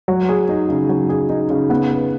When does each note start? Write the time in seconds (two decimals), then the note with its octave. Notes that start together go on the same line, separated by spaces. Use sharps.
0.08 F#3
0.29 G#4
0.49 D#4
0.69 C#3
0.89 F#3
1.09 G#4
1.29 D#4
1.50 C#3
1.70 B3
1.91 B4